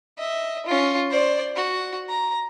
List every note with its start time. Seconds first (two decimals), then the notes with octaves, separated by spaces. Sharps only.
0.18 D#5 E5
0.66 C#4 F4
1.11 C5 D5
1.56 F#4
2.09 A#5